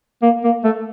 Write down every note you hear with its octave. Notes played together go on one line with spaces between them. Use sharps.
A#3
A#3
A3